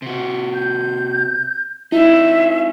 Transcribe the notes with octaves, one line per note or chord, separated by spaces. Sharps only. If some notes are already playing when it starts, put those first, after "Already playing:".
C3 F#4
G6
C4 D#4 E4 E5